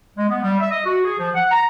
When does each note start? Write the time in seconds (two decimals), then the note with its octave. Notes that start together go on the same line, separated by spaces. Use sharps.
0.17 G#3
0.29 B3
0.43 G3
0.60 E5
0.71 D#5
0.85 F#4
1.04 G#4
1.18 F3
1.35 F#5
1.51 A#5